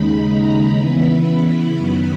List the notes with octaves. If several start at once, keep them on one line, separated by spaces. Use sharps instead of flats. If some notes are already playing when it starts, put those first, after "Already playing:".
Already playing: D#2 C#3 G#3 D#4 B5
A#5
C#3 E3 B3 E4 B5
B5
F#2 D#3 F#3 B3 B5